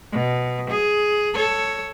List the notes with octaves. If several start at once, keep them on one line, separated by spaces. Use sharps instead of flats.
B2
G#4
A4 C#5